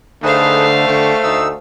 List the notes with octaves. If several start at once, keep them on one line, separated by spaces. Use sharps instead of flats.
D3 A3 D#4 G#4 B4 C5 F5
D3 G5 C#6
D2 D#4 E6